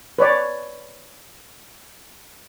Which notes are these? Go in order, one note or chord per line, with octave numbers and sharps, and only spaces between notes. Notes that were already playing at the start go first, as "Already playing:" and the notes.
B4 C#5 D5